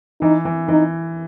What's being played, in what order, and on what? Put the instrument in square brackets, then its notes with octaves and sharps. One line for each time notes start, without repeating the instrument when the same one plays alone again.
[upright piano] E3 [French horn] D#4
[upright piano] E3
[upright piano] E3 [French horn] D#4